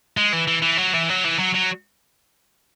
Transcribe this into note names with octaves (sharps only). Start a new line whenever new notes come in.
G#3
E3
E3
E3
F#3
E3
F#3
E3
F#3
F#3